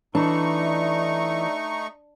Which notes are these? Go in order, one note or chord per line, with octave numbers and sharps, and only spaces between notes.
E3 A3 D4 D#4 C#6